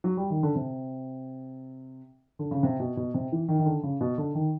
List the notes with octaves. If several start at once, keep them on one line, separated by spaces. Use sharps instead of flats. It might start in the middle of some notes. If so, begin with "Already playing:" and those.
F#3
G3
D#3
D3
C3
D3
C#3
C3
B2
B2
C3
E3
D#3
D#3
D3
C#3
B2
D3
D#3